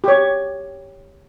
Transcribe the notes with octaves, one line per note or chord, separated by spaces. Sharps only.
G4 C#5